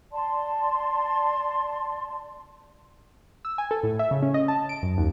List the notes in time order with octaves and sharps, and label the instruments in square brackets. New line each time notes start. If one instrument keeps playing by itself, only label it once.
[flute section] D5 A5 C6
[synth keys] E6
G#5
A4
A2
E5
C#3
C#4
D#5
A5
D7
F#2
D#2